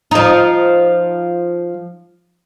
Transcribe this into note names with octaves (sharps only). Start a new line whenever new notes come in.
F3 D#4